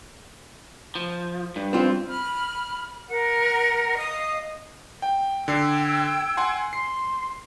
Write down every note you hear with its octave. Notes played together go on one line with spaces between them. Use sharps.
F3
G2
C4 F4
B5 F6
A#4 F#5
D#5 F5 D#6
G5
D3 G5 E6 G#6 C7
F#5 G#5 C6
C6 C7